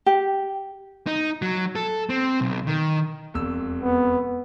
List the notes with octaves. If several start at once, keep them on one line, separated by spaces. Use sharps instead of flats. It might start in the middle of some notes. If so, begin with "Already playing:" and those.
G4
D#4
F#3
A4
C4
B1
D#3
E1 F2 E6
B3